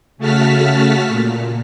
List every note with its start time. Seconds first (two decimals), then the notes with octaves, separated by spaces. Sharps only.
0.18 C#3 A3 F#4 A5 F6 B6
1.08 A#2